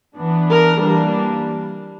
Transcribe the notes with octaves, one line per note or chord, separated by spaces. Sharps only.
E3 B3 D4
A#4
E3 G3 A#3 D4